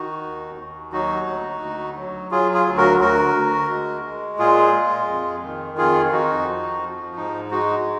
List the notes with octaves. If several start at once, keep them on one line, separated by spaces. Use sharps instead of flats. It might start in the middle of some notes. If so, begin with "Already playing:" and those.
Already playing: D#3 D#4 F#4
D#2
D#2
F#3 D#4 F#4
D2
D2
F#3
F#3 F4 G#4
F4 G#4
D2
F#4 A#4
D2 F#4 A#4
D2
G#3
G#3
A#2 F4 G#4
G#3
F2
D#3
F2 F4 G#4
F2 D#4 F#4
F3
F3
G#2 D#4
G#3 D#4 F#4